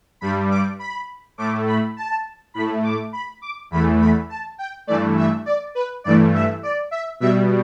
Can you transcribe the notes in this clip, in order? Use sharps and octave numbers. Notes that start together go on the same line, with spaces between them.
G2 G3 B5
D6
B5
A2 A3 D6
B5
A5
A2 A3 B5
D6
B5
D6
E2 E3 A3 B5
B5
A5
G5
G2 E3 A3 D5
E5
D5
B4
G2 E3 A3 D5
E5
D5
E5
B2 G3 E5